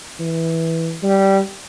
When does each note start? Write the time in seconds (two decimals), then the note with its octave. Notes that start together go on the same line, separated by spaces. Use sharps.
0.20 E3
1.03 G3